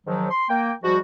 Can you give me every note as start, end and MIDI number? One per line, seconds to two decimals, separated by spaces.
0.07 0.29 44
0.07 0.29 51
0.07 0.29 53
0.07 0.29 54
0.31 0.46 84
0.49 0.73 58
0.49 0.73 79
0.83 0.99 44
0.83 0.99 53
0.83 0.99 55
0.83 0.99 66